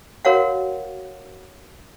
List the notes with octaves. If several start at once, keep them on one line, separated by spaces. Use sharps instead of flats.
F#4 A#4 C#5 F5 F#5